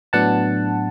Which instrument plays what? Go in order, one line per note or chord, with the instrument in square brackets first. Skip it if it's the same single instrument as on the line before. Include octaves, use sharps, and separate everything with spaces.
[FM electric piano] A2 F#3 B3 D4 F#5 A5